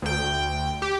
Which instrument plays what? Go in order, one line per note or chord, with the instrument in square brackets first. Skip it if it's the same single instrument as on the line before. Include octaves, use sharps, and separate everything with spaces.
[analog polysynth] D2 G5
G4